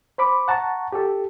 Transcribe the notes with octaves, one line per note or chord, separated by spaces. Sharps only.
C5 B5 D6
F#5 A5 A#5 C#6
G4 A4